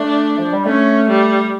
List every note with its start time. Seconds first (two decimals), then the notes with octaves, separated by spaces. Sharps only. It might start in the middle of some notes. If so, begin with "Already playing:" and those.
Already playing: A3 D4
0.38 F3
0.52 G3
0.66 A3 C#4
1.08 G3